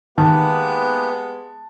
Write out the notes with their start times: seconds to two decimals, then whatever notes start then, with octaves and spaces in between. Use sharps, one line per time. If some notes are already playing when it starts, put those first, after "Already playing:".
0.18 D#3 G#3 A#3 B3 G4 B4 A5